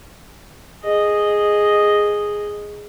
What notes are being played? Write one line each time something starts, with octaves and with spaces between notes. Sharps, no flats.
G#4 D#5